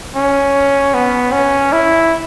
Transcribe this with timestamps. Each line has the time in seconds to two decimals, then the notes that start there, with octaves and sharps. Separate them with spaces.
0.16 C#4
0.94 B3
1.32 C#4
1.73 E4